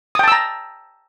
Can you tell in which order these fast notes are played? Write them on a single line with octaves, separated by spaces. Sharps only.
D#6 G5 A5 E6 A#5